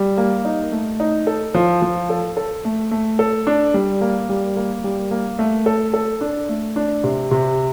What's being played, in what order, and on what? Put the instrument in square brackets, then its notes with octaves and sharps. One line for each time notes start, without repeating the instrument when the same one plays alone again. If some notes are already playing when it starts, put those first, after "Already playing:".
Already playing: [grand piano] G3
A#3
D#4
A3
D#4
A4
F3
F3
A4
A4
A3
A3
A4
D4
G3
A#3
G3
A#3
G3
A#3
A3
A4
A4
D4
A3
D4
C3
C3